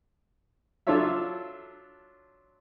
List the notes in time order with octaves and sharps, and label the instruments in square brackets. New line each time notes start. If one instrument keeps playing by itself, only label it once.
[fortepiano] F#3 D4 F4 A4 C#5 E5